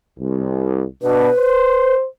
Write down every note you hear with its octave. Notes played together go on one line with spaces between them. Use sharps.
C2
B2 D4 B4
C5